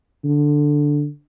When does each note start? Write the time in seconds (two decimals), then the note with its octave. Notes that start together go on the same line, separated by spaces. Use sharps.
0.25 D3